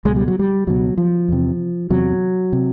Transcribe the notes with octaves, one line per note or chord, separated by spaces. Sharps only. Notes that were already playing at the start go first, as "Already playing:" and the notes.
C#2 B2 G#3
G3
F#3
G3
C#2 B2 F#3
F3
E2 C3
E2 C3 F#3
C3